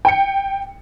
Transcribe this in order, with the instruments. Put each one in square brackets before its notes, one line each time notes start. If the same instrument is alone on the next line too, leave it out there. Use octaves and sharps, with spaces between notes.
[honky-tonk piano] G5 C#7